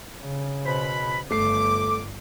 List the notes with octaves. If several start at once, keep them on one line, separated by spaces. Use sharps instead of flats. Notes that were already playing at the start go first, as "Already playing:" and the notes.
C#3
B2 B4 C5 B5
G1 A3 D6 C7